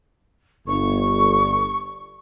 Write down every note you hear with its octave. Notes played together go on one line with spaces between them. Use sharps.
G1 C#6